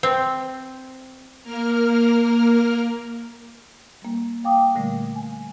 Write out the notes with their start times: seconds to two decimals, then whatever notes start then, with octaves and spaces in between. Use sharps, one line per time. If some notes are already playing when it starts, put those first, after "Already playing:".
0.03 C4
1.43 A#3 A#4 F6
4.02 G3 A#3
4.44 F5 G5 D6 D#6
4.75 A#2 D3 G3 A3
5.16 G#5